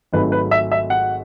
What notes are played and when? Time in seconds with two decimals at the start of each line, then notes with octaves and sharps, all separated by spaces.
0.13 G#1 G#2 F#3 A3 B4
0.32 B4
0.51 E5
0.72 E5
0.90 F#5